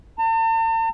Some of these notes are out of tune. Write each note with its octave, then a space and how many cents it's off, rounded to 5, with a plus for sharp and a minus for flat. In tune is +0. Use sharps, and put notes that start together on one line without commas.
A5 +45